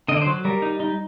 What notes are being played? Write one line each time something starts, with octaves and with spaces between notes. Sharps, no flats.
D3 D#5
D5
C5
F#3
G3 A#4
D#4
D#4